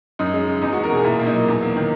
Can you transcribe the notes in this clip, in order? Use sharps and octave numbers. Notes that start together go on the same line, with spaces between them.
F#2 D#4
G#3
C#3
E2 D#4
G#3 F#4
A#4
B2 G#4
A#2 E4
A#3
D#4
F#3
E2
A#3
D#3